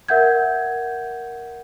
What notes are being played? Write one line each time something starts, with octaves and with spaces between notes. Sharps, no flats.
A#4 E5 F#5 G6 G#6